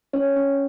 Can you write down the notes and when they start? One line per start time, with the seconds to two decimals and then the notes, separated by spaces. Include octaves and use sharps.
0.13 C#4 C#5
0.36 C#4